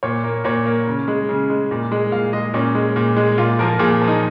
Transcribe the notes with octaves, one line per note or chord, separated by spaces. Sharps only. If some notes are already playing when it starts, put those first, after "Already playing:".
A#2 C#5
A#3
A#2 C#5
A#3
C#3
G#3
C#3
G#3
A#2
G#3
A#2 F5
G#3 D#5
A#2 C#4
G#3
A#2
G#3
A#2 F4
F3 A#3 A#4
A#2 G#4
F3 A#3
D#4